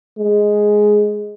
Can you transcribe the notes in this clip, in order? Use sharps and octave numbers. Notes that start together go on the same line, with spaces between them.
G#3